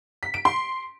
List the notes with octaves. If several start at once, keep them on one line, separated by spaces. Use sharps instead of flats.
B6
D7
C6